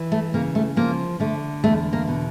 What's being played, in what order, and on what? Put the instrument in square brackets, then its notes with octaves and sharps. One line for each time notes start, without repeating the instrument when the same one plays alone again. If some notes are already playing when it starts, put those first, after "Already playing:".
Already playing: [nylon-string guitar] E3
A3
C#3 A#3
A3
F3 A#3
D3 A3
E2 A3
A#3
B2